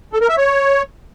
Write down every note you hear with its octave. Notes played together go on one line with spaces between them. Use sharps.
A4
A#4
E5
C#5